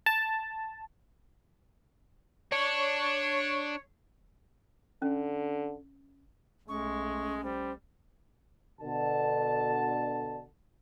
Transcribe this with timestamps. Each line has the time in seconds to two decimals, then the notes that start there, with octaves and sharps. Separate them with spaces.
0.06 A5
2.52 D4 C#5
5.02 D3 C#4
6.68 B1 G#3 A3 C#4 C#6
7.43 G3 C5
8.81 B2 D3 A5